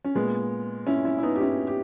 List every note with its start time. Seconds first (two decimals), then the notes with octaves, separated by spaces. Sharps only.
0.04 C#4
0.15 A#2 G#3 B3
0.87 C#4 E4
1.05 C#4 E4
1.18 E4
1.23 B3 D#4
1.36 G4
1.41 C#4 E4
1.67 G4